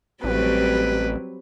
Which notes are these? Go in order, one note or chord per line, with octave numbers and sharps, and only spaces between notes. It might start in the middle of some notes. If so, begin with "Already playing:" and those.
A1 F#3 G3 C4 B4